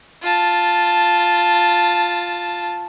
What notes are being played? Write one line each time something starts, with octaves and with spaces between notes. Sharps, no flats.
F4 A5